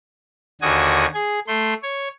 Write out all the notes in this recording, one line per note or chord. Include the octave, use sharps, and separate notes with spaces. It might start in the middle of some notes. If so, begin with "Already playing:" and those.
D#2 D3 F#4 G#5 D#6
G#4 G#5
A3 C6
C#5